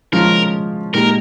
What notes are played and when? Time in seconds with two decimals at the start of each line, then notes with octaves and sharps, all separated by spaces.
0.12 F3 G#3 C#4 F4 A#4
0.94 A#2 G#3 D#4 G4 A#4